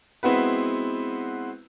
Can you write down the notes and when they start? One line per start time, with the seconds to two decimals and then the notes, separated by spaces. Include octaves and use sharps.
0.23 G#3 B3 C4 E4 F#4 B4